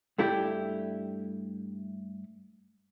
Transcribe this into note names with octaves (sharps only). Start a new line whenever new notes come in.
G2 A3 E4 G4